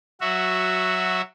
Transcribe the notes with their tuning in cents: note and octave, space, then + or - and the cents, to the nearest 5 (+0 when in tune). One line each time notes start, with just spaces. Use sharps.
F#3 +0 F#4 -5 E5 +0